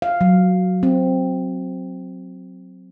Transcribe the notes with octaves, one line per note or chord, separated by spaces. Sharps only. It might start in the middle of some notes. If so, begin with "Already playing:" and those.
F5
F#3
C4